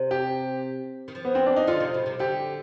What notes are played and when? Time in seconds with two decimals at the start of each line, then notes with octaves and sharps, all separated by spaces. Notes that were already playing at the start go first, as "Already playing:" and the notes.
Already playing: C3
0.11 G4
1.08 D#3
1.15 F3
1.25 B3
1.35 C4
1.46 D4
1.56 D#4
1.67 D3 F4
1.80 C3
1.94 B2
2.06 C3
2.19 D3 G4